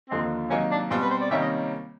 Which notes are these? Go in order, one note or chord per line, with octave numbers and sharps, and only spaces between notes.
D#2 D3 F3 A#3 C4 D#4
C3 D#3 F#3 A#3 C#4 D#4
D4
B2 G3 C4 F4
B4
C5
D5
C3 D#3 G3 A#3 C#4 E5
D#5